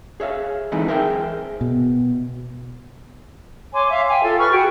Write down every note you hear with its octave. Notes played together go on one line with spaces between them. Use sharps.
G#4 C#5 E5 F5
D3 E3 G#3 C4 D#4 E4
G#4 A#4 C5 E5 F5 G5
B2
C#5 G#5 C6 D6
E5 F5
G5 G#5
F4 A4
B4 C#6 F6
F#4 G#4 G5